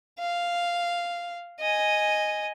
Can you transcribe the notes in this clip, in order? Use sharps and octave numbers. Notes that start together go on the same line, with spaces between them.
F5
D#5 G#5